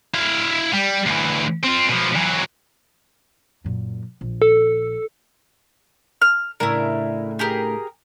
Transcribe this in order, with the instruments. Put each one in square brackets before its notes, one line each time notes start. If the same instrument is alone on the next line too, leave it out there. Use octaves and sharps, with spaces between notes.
[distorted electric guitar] E4 F5
G3
D2 E3
C4 F4
B2 F3
E3 F#3
[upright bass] F#2 A#2
A#1
[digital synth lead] A4
[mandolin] F6
[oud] A2 C#3 D4 [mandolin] E4 A#4
[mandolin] G4 G#4 A#4